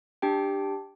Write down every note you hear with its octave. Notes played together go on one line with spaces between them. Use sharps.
D4 G4 G5